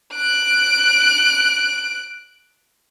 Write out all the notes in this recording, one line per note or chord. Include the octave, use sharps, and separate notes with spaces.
F#6 D7